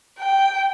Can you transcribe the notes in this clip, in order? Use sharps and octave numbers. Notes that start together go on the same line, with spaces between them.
G5